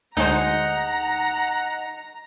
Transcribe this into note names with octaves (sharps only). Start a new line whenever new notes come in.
D2 G#3 D#4 C5 F#5 A#5